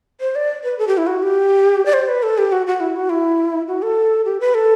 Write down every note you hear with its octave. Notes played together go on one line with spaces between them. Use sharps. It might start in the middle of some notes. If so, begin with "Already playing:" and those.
C5
D5
B4
A4
G4
E4
F#4
G4
D5
C5
B4
A4
G4
F#4
F#4
E4
F#4
E4
F#4
A4
G4
B4
A4